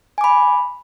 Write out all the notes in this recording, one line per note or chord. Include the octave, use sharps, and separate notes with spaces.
G#5 B5 D6